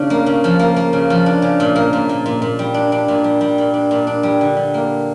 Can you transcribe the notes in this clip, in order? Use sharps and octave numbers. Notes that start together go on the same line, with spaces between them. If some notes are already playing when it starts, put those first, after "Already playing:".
Already playing: C#3 D4
A#3
C#3
F3
A#3
A#3
C#3
F3
D4
C#3
A#2
A#3
A#2
A#2
A#2
A#2
G3
D4
D4
A#2
G3
G3
A#2
D4
A#2
D4
G3
D3
G3
A#3